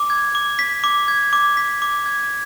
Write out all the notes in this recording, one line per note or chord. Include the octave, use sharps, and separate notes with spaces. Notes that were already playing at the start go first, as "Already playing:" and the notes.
Already playing: D6
G#6
D6
B6
D6
G#6
D6
B6
D6
G#6